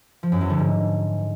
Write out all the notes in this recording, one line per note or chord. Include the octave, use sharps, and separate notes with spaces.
F3
F#2
E2
D3
G#2